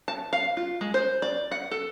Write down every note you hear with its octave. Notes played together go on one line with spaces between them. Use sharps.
A5
F5
F4
G#3
C5
D5
F#5
A4